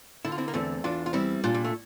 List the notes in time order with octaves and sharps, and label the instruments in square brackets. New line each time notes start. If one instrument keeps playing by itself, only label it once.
[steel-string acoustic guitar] D3 [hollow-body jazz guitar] E4
[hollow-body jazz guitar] F4
C4 E4
A#3
[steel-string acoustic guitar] E2 [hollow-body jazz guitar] A3 C4
[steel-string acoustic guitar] E2 [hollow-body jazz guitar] D4 F4
[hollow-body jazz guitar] F4
[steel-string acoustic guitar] G3 [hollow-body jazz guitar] C4 E4
[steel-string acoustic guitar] A#2 [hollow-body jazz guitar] D4 F4
[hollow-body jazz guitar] G3
A3